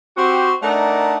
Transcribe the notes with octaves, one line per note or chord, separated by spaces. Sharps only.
C4 F#4 G4
A3 D4 D#4 A#4 D5 F#5